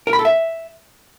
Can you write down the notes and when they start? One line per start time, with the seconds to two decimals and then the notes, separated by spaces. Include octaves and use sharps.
0.07 A#4
0.13 B5
0.19 A4
0.25 E5